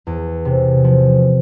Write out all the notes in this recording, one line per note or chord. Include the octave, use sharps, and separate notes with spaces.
E2
C3
F3